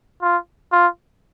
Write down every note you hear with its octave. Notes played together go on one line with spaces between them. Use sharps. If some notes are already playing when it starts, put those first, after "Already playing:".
F4
F4